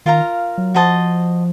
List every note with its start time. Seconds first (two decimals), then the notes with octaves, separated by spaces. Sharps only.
0.06 D#3 F4 A#4 F5 A#5
0.58 F#3
0.74 F3 F#4 C5 D#5 A5